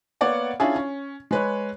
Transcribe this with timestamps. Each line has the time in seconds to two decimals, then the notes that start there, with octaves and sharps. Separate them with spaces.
0.21 A#3 B3 C#5 D5 F#5
0.60 C#4 D4 E4 F4 G#4
0.76 C#4
1.31 G#3 B4 C#5